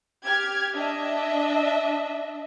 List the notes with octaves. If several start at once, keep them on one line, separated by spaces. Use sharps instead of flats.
G4 F6 G#6
D4 D#5 E5